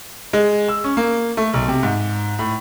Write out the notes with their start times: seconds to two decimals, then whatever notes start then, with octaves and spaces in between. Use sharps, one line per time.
0.33 G#3
0.69 E6
0.84 C#4
0.97 A#3
1.37 A3
1.54 B1
1.68 C3
1.83 G#2
2.39 A2